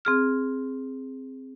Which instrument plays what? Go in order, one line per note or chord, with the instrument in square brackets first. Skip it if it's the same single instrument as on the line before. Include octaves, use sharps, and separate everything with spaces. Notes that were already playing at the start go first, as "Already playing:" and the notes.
[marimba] C4 G#4 F6